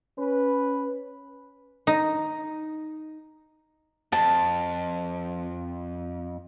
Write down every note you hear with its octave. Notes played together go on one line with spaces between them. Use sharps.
C#4 B4
D#4
F2 A5